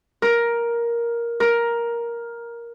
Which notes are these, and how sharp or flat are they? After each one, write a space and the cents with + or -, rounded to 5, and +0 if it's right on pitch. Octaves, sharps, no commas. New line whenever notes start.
A#4 +10
A#4 +10